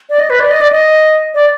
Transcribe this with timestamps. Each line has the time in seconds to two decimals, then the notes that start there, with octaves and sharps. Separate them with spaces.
0.09 D5
0.19 D#5
0.30 B4
0.40 D5
0.51 D#5
0.61 D5
0.72 D#5
1.34 D5